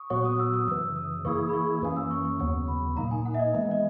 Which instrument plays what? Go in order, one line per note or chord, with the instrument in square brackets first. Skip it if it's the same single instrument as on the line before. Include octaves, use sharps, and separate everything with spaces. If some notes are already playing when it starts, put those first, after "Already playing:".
Already playing: [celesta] C#6 D#6
[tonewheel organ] A#2 F#3 B3 F#4 [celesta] C#6
[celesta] D#6
E6
D#6
[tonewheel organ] F#2 C#3 E3 [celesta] E6
[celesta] D#6
[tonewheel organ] E3 A#3 E4 G#4 [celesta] C#6
[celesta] B5
C#6
[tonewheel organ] F#2 E3 A#3 C#4 [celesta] D#6
[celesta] E6
C#6
C#6
[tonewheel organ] D#2 C#3 F#3 B3 [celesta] C#6
[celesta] B5
[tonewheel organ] A#2 A#3 D#4 [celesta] A#5
[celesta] G#5
F#5
E5
D#5
[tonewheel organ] E3 G#3 B3 [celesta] E5
[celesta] D#5